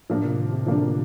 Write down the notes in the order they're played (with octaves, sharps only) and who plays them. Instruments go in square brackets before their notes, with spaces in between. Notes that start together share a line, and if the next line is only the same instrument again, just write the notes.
[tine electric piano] A2 [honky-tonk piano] F3 A#3 D4
[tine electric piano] C3
D#3
C3
[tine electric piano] D3 [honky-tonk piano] F3 A#3 D4